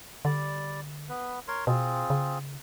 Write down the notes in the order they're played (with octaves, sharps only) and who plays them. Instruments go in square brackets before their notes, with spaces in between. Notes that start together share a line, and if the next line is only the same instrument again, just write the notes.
[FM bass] D3 [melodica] G3 D5
[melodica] B3 B4
A#4 C#5 C6
[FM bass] B2 [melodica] C4 F4 G#4
[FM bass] C#3